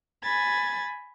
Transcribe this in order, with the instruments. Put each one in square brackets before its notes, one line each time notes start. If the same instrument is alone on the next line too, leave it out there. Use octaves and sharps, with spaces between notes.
[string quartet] G#5 B5 G#6 A6